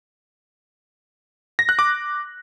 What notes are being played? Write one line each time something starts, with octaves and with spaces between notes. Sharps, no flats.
A#6
F#6
D6